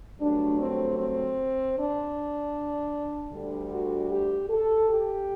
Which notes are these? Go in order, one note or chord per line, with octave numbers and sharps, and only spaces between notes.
G2 F#3 A3 D4
C4
C4
D4
D2 D3 G3
F#4
G4
A4
G4